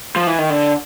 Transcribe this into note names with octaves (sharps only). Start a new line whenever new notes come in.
F3
E3
D#3
D3